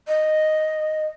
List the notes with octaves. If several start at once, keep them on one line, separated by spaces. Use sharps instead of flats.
D#5